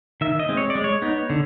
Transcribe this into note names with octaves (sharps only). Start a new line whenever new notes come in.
D#3 E5
D#5
G#3 C4
C#5
D5
G#3
C#5
B3 D#4
D3